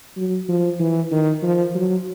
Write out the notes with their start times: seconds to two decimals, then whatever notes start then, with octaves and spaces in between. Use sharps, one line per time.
0.17 F#3
0.48 F3
0.79 E3
1.11 D#3
1.42 F3
1.75 F#3